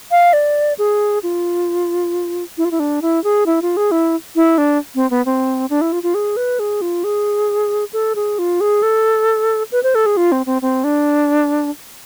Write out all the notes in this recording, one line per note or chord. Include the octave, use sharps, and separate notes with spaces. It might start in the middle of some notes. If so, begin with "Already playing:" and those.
F5
D5
G#4
F4
E4
F4
E4
D4
E4
G#4
E4
F4
G#4
E4
E4
D4
C4
B3
C4
D4
E4
F4
F4
G#4
B4
G#4
F4
G#4
A4
G#4
F4
G#4
A4
B4
C5
A4
G#4
F4
C4
C4
C4
D4